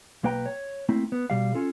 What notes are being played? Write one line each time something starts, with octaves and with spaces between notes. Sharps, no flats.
B1 A#3 B4 G5 A#5
C#5
A3 A#3 C4 E4
B3
B2 G3 F5
C#4 F4 A4